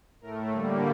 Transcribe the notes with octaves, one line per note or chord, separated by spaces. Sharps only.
A2 A3 A#4
D3 G3 A#3